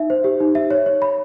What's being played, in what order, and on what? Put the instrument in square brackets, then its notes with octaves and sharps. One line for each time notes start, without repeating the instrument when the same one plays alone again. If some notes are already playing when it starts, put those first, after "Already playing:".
Already playing: [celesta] D#4 E5
C5
G4
D#4
E5
C#5
C#5
B5